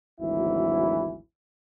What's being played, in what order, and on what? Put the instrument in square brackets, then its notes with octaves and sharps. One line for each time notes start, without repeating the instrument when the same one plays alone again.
[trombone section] G#1 D2 E3 F#3 E4